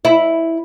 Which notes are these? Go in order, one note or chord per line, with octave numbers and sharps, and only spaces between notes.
E4